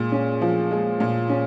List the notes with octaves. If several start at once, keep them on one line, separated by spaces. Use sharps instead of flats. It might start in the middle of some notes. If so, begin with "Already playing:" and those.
Already playing: A#2 G#3
C#4
F3
G#3
A#2
C#4